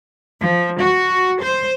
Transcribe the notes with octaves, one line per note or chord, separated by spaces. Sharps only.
F3
F#4
C5